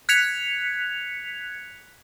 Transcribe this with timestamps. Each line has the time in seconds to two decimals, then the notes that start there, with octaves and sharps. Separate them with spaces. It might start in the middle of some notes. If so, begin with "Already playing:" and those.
0.09 F#6 G#6 B6 C#7 F7